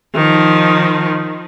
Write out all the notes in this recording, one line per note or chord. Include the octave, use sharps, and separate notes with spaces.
D#3 F3